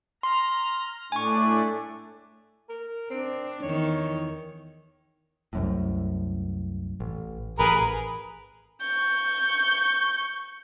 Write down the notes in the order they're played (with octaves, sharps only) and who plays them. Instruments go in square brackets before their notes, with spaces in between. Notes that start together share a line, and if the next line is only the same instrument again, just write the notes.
[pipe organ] A#5 F6 [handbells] C6
[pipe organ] A2 A3 D4 [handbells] G#5 C#6
[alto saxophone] A#4
[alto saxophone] C4 [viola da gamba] D4
[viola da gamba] E2 D#3 [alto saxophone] C#5
[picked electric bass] C2 F#2 A2
A1
[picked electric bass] A1 [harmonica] G#4 A#4 B4
[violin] C#6 G6